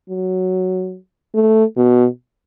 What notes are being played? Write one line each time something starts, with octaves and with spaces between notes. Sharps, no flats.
F#3
A3
B2